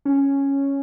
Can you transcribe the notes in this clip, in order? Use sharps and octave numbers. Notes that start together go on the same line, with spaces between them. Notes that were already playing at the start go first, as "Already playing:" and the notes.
C#4